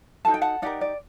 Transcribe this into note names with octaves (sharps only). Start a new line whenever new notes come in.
D#4 F#4 A4 A5
G5
F#5 A5
D#4 G4 A#4 D5 F#5
D5